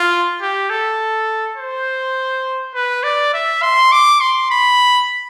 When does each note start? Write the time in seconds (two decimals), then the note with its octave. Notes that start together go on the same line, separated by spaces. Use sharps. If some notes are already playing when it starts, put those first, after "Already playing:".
Already playing: F4
0.41 G4
0.70 A4
1.57 C5
2.75 B4
3.03 D5
3.34 E5
3.62 C6
3.92 D6
4.21 C6
4.50 B5